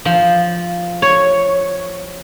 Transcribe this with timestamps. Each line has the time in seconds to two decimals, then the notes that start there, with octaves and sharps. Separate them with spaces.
0.05 F3
1.02 C#5